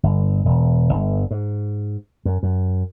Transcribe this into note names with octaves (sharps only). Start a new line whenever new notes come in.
G1
E1
G1
G#2
F#2
F#2